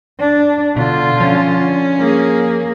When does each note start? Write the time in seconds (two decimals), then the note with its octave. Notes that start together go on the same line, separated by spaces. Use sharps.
0.20 D4
0.77 B2 D3 F4
1.20 F3 C#4
1.99 A#3 G#4